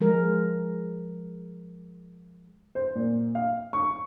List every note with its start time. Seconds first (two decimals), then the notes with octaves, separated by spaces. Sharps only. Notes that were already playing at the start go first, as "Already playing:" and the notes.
0.01 F3 G#3 A#4
2.75 C5
2.95 A#2
3.35 F5
3.73 C#6